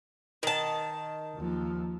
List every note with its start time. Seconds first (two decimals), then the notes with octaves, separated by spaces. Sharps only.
0.43 D#3 A5
1.35 D#2 F3